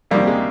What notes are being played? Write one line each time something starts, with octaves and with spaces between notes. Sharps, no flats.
D2 C3 D#3 G3 A#3
G#3